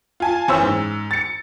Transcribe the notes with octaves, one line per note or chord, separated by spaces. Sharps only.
F4 G#5 A5
F#1 E3 C5 C#5 E6
G#2
A6 C#7